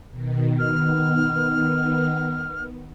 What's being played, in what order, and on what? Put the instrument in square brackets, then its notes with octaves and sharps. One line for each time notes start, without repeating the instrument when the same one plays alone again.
[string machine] B2 D#3
[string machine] D#3 B3 [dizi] F6